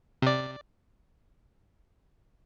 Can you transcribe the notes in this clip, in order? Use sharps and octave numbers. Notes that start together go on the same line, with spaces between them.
C3 D5